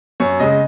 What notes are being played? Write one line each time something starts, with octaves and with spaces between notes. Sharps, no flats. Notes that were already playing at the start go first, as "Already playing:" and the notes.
F#2 C#5
C#3 G#3 D#5